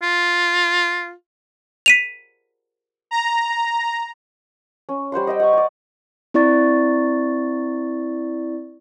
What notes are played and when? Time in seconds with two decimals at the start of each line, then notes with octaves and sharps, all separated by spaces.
0.03 F4
1.86 B6 D#7 F7
3.11 A#5
4.89 C#4
5.12 G3 C5 F#5 C6
5.27 D#5 E5 G5
5.40 F#5 A#5 C#6
5.53 D5 G#5
6.34 C4 E4 D5 C#6 A6